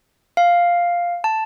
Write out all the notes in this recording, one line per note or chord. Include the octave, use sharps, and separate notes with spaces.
F5
A5